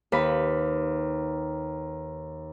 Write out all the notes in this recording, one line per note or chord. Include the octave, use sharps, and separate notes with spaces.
D#2 B4 B5